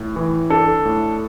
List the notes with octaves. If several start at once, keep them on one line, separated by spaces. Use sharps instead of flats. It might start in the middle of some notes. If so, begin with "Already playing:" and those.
Already playing: A2
E3
D4 A4
A2